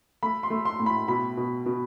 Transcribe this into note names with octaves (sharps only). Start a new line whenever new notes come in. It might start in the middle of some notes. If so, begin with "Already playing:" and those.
A3 B5
C6
A3
C6
A2
B5
B2 B5
B2
B2